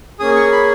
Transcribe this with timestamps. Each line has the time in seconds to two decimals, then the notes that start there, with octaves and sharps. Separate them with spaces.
0.19 A#3 C#4 G#4 D#6
0.36 C#6
0.52 B5